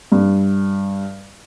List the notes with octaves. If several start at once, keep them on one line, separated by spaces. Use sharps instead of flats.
G2